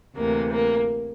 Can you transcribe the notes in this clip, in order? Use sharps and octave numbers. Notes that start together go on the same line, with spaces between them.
D2 C3 E3 A#3
A#3